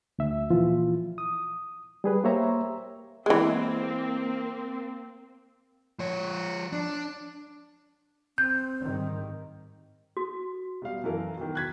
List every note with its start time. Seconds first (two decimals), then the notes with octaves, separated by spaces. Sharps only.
0.19 D2 E5
0.50 A#2 E3 F3 F4
1.18 D#6
2.04 G3 G#4 B4
2.24 A#3 G4 C5 C#5 E5 A#5
3.26 E3 G#3 A#3 C4
5.99 F3 C#5
6.73 D4
8.38 C4 G6
8.82 G#2 D#3 G3
10.17 F#4
10.82 B2 G3 F5
11.04 F#2 E3 A4 A#4 F5
11.37 B2 D#3
11.55 F#6 G#6 B6